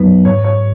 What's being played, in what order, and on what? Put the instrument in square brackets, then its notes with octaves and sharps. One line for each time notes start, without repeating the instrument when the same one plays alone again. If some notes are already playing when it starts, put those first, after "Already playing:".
Already playing: [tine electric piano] F#2 F#3 B3 D#4 [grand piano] B4
[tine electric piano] G#2 [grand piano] C#5
[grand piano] C#5